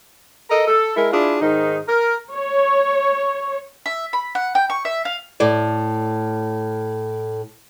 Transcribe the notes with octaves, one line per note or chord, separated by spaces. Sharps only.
A4 A#4 D#5
A4
G#3 E4 A#4
D4 E4 F4 G#4
G#2 D#3 D#4
A#4
C#5
E5
B5
F#5
G5
C#6
E5
F5
A2 D5